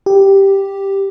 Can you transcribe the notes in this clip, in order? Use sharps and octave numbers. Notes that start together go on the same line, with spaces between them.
G4